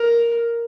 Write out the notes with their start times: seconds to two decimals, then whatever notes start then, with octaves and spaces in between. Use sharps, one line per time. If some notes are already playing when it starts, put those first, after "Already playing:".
Already playing: A#4